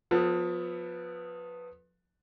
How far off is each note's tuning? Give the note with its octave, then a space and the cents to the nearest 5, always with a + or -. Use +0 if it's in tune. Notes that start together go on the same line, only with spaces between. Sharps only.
F3 +30 B3 +0 A4 +15